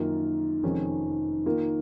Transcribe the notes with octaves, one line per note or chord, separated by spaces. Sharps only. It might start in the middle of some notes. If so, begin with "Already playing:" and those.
Already playing: F#2 D#3 A#3 F4
F1 F2 D#3 G#3 C#4
D#3 A#3 F4